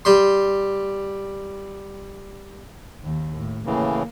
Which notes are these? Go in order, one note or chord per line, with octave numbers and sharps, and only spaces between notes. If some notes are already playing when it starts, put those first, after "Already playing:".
G3 C6
D#2 D#3
A2
A2 C#3 E3 A#3